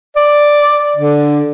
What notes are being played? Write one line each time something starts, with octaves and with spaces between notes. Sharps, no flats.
D5
D3